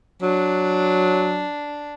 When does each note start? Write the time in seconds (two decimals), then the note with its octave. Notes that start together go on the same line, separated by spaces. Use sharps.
0.22 F#3 D4